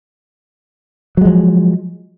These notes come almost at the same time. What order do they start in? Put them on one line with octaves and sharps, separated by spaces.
F#3 G#3 F3